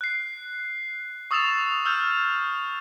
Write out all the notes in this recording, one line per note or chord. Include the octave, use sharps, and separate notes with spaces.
F#6 C7
C#6 D#6 E6 A6 E7 F7
E6 F6 G6